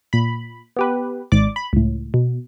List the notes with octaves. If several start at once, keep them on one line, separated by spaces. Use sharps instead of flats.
A#2 B5
B3 G4 B4
G#1 G#2 D5 D6
B5
C#2 A2
B2